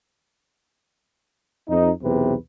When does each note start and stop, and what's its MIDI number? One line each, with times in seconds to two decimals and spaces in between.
1.69 1.90 41
1.69 1.90 63
2.02 2.34 35
2.02 2.34 40
2.02 2.34 48
2.02 2.34 71